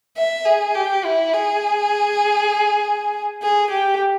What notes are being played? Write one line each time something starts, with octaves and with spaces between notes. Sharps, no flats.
E5
G#4
G4
E4
G#4
G#4
G4